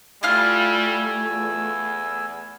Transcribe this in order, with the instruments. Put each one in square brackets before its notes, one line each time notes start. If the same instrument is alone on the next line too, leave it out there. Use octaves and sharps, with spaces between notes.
[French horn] G3 [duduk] A3 [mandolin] E4 F4 F6 [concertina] G#5 E6
[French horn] E2